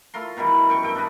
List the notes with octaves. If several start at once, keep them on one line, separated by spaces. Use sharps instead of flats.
A3 F4 A#4 C6
B2 D#3 E3 G3
F#2 G5 C#6
G2 A4 G5
D4 A#4 B4 D#5